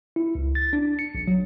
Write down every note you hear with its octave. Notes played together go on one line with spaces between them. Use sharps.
E4
C#2
A6
D4
C#7
A#1
F#3